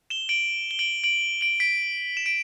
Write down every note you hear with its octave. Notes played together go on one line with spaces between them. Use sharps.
E7 G7
D7 F#7
G7
D7 F#7
D7 F#7
D7 F#7
B6 D7
E7
D7